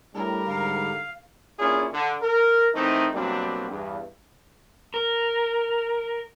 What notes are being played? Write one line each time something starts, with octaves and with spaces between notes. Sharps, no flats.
A2 G3 D4 A#4
G#2 D3 F5
A#3 C#4 D4 E4 F4 G#4
D3
A#4
D#3 E3 A3 C4 D#4
B2 F#3 G3 A#3 C4 D4
E2 G2
A#4